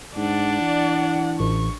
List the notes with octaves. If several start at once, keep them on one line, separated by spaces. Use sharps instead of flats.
G#2 D4 D5 F#5
E3
A1 C#6